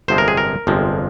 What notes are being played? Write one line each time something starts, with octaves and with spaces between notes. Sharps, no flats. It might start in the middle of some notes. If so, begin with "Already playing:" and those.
G1 F2 C3 F3 G#3 C5
A#4
G#4
A#4
G1 F2 C3 F3 G#3